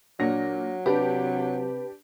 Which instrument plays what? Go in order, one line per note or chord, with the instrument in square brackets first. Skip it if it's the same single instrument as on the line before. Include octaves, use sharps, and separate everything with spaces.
[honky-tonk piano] A#2 A#6 [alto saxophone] F#3 [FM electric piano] D4
[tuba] C3 [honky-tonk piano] D4 G4 [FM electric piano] B4